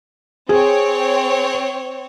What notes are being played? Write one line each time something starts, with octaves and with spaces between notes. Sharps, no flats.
C4 G#4 C#5